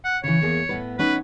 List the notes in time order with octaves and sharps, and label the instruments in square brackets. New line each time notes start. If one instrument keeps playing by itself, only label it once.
[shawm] F#5
[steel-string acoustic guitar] C#3 E3 [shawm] C#5
[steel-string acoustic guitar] E2 A#3 G#4
A2 B3 B4
[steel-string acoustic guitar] B3 C#4 D#4 [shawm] B4